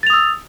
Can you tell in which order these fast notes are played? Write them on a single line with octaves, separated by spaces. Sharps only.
A6 F7 D#6 E6